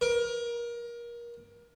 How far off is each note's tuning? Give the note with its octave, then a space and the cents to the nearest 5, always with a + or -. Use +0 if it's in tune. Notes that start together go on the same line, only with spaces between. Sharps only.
A#4 +25